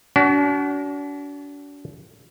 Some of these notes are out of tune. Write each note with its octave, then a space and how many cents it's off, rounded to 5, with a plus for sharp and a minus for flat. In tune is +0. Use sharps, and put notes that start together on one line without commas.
D4 -40 F#4 +30